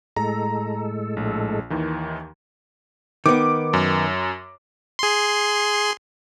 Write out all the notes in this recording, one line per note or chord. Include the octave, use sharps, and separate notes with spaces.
A2 G#3 A4 A#5
A#1
D#2 D#3 E3
D#3 B3 D6
F#2
G#4 C6